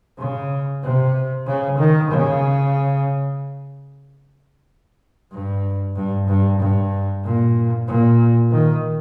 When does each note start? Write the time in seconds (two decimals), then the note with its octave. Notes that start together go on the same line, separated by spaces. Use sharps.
0.18 C#3
0.83 C3
1.47 C#3
1.79 D#3
2.11 C#3
5.32 G2
5.95 G2
6.27 G2
6.60 G2
7.24 A#2
7.88 A#2
8.52 D#3